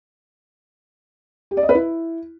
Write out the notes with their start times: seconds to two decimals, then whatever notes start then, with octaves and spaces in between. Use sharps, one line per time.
1.51 G4
1.57 D5
1.63 D#5
1.69 B4
1.75 E4